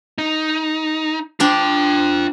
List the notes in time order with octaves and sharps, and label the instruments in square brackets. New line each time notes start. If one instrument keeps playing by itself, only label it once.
[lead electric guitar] D#4
[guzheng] D4 C5 [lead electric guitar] F4 G5